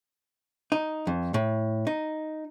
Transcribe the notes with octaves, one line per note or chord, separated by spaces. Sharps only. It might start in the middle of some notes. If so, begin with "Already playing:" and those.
D#4
F2
A2
D#4